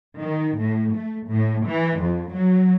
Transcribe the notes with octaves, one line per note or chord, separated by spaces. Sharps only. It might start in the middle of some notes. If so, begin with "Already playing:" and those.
D#3
A2
A3
A2
E3
F2
F#3